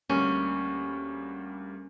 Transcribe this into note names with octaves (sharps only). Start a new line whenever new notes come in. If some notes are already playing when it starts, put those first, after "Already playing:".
D2 G3 A#3 C#4